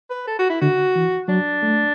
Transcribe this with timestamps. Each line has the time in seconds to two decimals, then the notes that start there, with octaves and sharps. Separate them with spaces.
0.10 B4
0.27 A4
0.39 F#4
0.50 E4
0.61 D3 F#4
0.95 E3
1.28 F#3 D4
1.63 A3